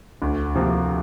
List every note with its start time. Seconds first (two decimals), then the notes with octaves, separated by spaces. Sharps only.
0.22 D2
0.55 C3 F3 A#3